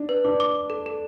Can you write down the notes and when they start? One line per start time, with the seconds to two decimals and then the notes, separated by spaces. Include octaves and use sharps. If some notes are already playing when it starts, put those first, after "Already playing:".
Already playing: D4
0.09 B4
0.24 D4 D6
0.40 D6
0.55 D6
0.70 A4
0.86 A4